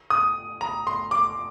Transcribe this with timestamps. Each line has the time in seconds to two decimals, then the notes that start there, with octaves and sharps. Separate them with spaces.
0.10 D#6
0.61 A#5
0.87 C6
1.11 D6